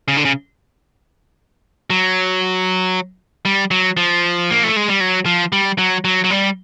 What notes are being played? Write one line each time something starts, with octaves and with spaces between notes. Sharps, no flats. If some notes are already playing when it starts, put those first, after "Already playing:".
C#3
D3
C#3
F#3
G3
F#3
F3
A#3
A3
G#3
G3
F#3
F3
G3
F#3
F#3
F#3
G3